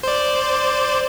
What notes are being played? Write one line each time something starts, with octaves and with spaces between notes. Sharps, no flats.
C5 D5